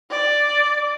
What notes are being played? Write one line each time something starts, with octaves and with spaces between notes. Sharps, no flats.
D5